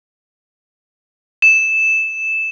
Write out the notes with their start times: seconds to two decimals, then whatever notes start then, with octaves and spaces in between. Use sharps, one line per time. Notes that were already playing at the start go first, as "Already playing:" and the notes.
1.42 E7